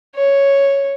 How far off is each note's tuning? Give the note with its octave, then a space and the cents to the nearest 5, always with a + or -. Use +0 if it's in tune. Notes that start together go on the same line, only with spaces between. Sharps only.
C#5 +0